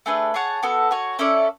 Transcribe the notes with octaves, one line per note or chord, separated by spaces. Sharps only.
A3 D4 G#4 B4
G#4 C#5 F#5 A5
B3 F#4 A4
F#4 C#5 G#5
C#4 E4 A4 D5